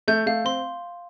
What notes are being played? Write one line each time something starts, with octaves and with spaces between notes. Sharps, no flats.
A3 G6
A3 F5
C4 C6